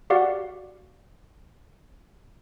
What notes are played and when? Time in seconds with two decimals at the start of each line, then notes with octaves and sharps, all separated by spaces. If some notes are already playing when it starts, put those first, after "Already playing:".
0.10 F#4 G4 D5 F5 F#5